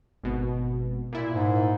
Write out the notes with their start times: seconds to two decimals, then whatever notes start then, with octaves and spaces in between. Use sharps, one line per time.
0.23 G#1 B2
1.13 A#2 E4
1.33 G#2